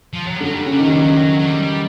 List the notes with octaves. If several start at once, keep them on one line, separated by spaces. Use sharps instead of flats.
F3
F#3
G3
D3
F#3
G3
C#3 F#3
G3
D#3 F#3
G3
F#3
G3
F#3
F#3
G3
G3